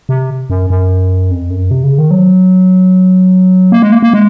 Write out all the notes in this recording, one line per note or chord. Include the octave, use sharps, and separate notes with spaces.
C3
F#2
F#2
F2
F#2
C3
C#3
D#3
F#3
A#3
G#3
A#3
A#3
G#3